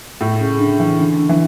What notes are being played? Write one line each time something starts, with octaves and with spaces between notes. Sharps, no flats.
A2
C#3
D3
E3
D3
D3
E3